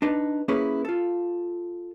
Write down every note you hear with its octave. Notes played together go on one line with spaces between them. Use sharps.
D4 D#4 B4
A#3 C#4 E4 G#4 B4
F4 A4